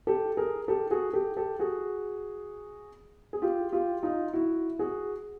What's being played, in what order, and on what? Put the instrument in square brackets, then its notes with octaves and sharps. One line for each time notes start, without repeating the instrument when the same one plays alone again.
[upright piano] G4 A4
G#4 A#4
G4 A4
F#4 G#4
G4 A4
G4 A4
F#4 G#4
G#4
F4 G4
F4 G4
D#4 F4
E4 F#4
F#4 G#4